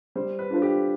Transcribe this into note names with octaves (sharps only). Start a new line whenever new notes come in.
G3 C5
B4
D4 F4 A4 C5
G4